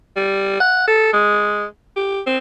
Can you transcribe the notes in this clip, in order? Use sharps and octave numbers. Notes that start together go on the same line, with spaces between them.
G3
F#5
A4
G#3
G4
C4